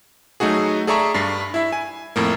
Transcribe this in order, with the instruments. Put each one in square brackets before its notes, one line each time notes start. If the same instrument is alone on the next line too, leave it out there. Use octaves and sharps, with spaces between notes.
[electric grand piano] F#3 A3 D#4 F#4 G#4
G#4 A4 D5 E5 A#5 C#6
G2 G3 C7
E4 E5
G#5
F2 A2 A#3